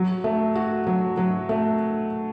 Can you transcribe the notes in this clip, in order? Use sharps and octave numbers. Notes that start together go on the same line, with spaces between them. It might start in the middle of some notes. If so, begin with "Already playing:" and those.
Already playing: F#3
A3
F#4
F#3
F#3
A3